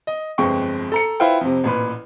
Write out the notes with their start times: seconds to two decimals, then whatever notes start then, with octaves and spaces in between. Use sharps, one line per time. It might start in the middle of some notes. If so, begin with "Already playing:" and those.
0.07 D#5
0.38 G1 F2 G#3 G5 C#6
0.92 A4 A#5 C#7
1.20 E4 F4 B4 C5 F5 G5
1.41 F2 C3
1.64 A1 A#2 B4